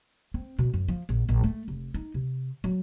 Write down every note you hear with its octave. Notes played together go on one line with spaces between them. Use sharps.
C4
B2
F#2
F3
A#1
A#1
A3
F1
D#4
C3
F#3